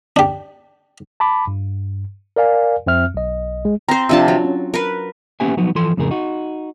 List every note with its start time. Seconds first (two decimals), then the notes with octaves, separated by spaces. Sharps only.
0.16 D4 G4
1.20 A5 B5 D6
1.47 G2
2.36 A#4 D5 F5 G#5
2.87 F2 C4 E5 F6
3.14 B1 D#5
3.65 G#3
3.89 C4 C5 A#5 C6
4.09 C3 F3 D4 A5 E6
4.28 F#3
4.45 C#4
4.74 A#4 B4
5.40 A#3 B3 C#4 G4 E5 G#5
5.57 F3 F#3 B3 D#4
5.75 E3 F3 A4 C6
5.97 F2 A2 C#3 G#4 A#4
6.11 D#4 F#4